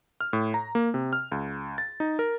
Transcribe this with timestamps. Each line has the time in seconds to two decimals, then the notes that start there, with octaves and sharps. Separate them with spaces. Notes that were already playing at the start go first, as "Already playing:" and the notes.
0.21 F6
0.33 A2
0.54 A#5
0.75 A#3
0.94 C3
1.13 F6
1.32 C#2
1.78 A6
2.00 D#4
2.19 A#4